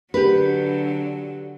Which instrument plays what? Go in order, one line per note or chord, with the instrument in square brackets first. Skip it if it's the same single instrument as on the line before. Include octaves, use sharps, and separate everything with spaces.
[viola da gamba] D3 F#3 [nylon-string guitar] G4 B4